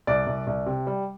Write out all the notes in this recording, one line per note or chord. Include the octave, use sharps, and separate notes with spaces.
C2 D5
C2
C2
C3
G3